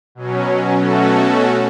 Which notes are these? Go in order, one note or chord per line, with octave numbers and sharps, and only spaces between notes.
B2 F#3 C#4
B2 A3 C#4 F#4 A4